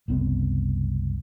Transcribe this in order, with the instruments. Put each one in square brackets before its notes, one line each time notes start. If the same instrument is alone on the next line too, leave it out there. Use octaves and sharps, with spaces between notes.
[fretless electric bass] F#1 C2 B3 C4